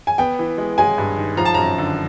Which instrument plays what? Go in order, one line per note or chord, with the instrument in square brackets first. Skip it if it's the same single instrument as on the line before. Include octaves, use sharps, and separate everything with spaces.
[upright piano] G#5
[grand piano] B3 [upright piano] G5
[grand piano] E3
G#3
[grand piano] G#3 [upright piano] G#5
[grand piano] G2
D#3
[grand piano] F3 [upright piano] A#5
[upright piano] A5
[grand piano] F#2 [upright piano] A#5
[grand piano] D3